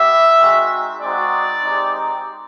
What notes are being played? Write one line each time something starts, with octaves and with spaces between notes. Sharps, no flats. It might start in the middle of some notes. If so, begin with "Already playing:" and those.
Already playing: B3 E4 G4 E5
G#3 C4 D#4 F#4
G#3 C4 D#4 F#4 D5
G#3 C4 D#4 G4